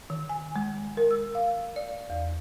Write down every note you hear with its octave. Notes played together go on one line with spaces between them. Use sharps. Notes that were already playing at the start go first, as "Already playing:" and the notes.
D#3
G#5
G#3
A#4
E6
F5
D5
E2